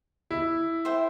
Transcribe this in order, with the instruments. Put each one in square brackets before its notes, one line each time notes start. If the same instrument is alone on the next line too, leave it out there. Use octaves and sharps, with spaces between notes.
[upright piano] E4
[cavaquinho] C5 E5 G5